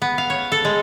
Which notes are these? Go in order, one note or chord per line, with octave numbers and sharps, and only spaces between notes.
B3
F5
C#5
A4
G#3